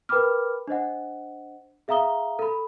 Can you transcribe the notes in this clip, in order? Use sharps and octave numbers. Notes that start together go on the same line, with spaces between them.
A#4 B4 G5 B5 D6 F6
D4 C5 D#5 F#5
G#4 E5 F5 A#5 D#6 G7
A4 B5